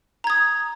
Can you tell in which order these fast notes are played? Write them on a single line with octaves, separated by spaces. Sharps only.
A#5 G#6 D#6